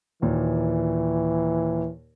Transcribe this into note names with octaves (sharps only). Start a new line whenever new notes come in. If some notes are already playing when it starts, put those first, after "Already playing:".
D#2 A#2 E3